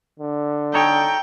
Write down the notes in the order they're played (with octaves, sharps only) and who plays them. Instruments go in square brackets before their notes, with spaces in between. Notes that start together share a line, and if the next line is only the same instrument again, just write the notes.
[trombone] D3
[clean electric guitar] D#4 A4 C#5 [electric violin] G5